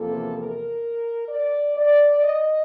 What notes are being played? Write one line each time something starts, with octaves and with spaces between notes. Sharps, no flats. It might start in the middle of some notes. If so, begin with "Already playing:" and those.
Already playing: E2 C3 F3 A#3 A4
A#4
D5
D5
D#5